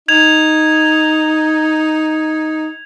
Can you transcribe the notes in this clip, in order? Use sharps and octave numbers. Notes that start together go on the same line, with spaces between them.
D#4 G#6 F7